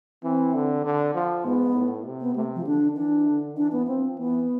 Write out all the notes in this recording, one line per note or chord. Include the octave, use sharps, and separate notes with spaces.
E3 C4
D3
D3
F3
G#2 B3
A2
C3
B3
C3 A3
F3
D3 D4
E3 D4
D3
E3 D4
B3
F3 C4
E3 B3